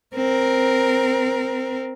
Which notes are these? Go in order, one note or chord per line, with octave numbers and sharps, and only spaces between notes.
C4 A#4